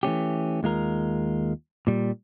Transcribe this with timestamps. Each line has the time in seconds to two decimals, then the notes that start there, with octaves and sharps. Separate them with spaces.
0.03 E3 A3 C#4 G4
0.63 D#2 G#3 F4 A#4
1.87 A#2 G3